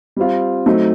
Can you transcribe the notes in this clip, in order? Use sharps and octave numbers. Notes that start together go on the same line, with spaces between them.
G3 C4 F4
F#3 A3 C4 D#4